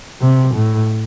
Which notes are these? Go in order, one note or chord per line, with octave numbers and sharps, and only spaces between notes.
C3
A2